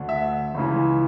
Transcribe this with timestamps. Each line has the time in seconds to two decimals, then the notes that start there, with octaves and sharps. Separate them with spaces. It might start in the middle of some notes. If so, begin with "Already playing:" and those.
Already playing: D2 D3
0.09 E5
0.54 C#2 C#3 E3